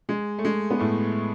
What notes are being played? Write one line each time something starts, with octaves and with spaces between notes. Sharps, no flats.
G#3
A3
G#3
B3
A2 A3